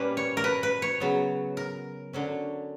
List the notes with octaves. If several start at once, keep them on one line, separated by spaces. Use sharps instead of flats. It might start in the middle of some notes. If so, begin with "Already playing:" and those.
Already playing: A#2 G3 A#3 C#4 B4
C#5
A#4
B4
B4
C#5
C#3 F#3 B3
A#4
D3 F#3 C#4